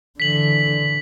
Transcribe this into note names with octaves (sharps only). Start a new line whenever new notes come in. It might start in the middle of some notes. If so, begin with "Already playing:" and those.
D3 E3 B6 F#7